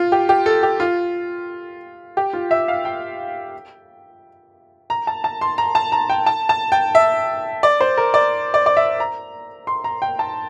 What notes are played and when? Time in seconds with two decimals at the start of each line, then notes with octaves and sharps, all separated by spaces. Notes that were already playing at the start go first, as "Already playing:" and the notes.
Already playing: F4
0.12 G4
0.29 G4
0.46 A4
0.63 G4
0.80 F4
2.17 G4
2.33 F4
2.51 E5
2.68 F5
2.85 G5
4.90 A#5
5.07 A5
5.24 A5
5.41 C6
5.58 A#5
5.75 A5
5.92 A#5
6.09 G5
6.26 A5
6.49 A5
6.72 G5
6.95 E5
7.63 D5
7.81 C5
7.97 A#4
8.14 D5
8.54 D5
8.66 D5
8.77 E5
9.00 A#5
9.67 C6
9.84 A#5
10.02 G5
10.19 A5